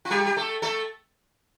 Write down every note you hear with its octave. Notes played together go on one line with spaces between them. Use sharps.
F4
G3 G4
G4
A3 A4
A3 A4